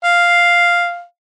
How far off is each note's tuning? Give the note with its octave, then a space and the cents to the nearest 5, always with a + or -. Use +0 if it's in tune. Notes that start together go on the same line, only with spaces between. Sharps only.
F5 +0